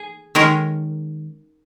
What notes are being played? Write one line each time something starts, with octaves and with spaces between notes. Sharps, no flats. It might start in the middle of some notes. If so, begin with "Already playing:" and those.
Already playing: G#4
D#3 G#3 C#4 A#4